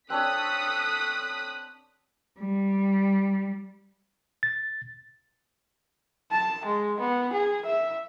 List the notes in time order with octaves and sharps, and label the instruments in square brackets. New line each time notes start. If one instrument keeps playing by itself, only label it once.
[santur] C4 D4 C#5 [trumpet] A4 [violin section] D#6 B6 [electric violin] F#6
[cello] G3
[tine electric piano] A6
[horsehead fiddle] A5
G#3
B3
G#4
E5